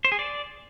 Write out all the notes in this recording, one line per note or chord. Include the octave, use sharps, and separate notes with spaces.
C5
G#4
D5